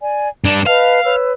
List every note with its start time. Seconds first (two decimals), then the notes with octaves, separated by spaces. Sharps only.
0.01 D5 G#5
0.44 G2 D4 D5 A#5
0.66 B4 D#5 F5 A5
1.04 B4 C#5 E6